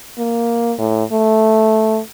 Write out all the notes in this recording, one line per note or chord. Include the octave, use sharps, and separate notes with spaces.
A#3
A2
A3